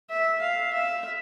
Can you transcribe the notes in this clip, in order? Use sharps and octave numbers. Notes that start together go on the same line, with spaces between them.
E5
F5
E5